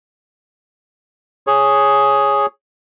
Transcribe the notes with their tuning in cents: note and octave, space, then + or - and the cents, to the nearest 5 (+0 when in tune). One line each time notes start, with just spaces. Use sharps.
G#4 +0 C#5 +0